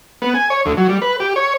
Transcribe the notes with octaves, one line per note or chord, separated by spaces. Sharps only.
B3
G#5
C#5
D2
F#3
G3
B4
G4
C#5